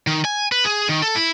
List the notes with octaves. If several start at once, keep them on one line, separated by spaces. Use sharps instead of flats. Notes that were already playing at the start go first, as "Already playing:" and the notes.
D#3
G#5
B4
G#4
D#3
A4
E4